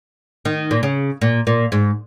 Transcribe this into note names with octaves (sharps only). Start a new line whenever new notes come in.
D#3
A#2
C#3
A#2
A#2
G#2